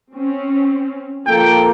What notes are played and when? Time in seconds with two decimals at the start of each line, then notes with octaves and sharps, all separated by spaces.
0.13 C4 C#4
1.26 F3 A#3 A4 G5